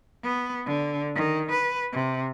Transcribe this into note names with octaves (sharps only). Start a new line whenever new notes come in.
B3
D3
D#3
B4
C3